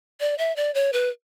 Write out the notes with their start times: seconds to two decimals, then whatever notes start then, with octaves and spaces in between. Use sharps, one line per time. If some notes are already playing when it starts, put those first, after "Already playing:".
0.20 D5
0.38 E5
0.56 D5
0.74 C#5
0.93 B4